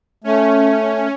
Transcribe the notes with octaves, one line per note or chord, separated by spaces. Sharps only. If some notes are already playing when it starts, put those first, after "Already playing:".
A3 C#4